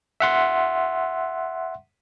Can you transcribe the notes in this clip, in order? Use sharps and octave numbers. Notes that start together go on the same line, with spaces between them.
E5 F#5 C6